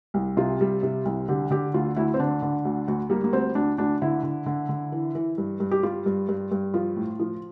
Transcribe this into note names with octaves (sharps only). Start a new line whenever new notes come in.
C2
C3 F4
G3
C3
C2
D3 G4
D3 G4
D2 F4
D2 E4
C4
D3 D4
D3
D2
D2
G3 A#3
A#3
D2 C4
D2 D4
D2 D4
D3 E4
D3
D3
D3
E3
E3
G2
G2
G4
G3 F4
G2
G2
G2
F3 F4
A2
F3